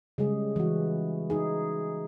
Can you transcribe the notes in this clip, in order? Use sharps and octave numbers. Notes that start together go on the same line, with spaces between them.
C#3 G3 G#3 G#4
E3 F#4
D#4 G#4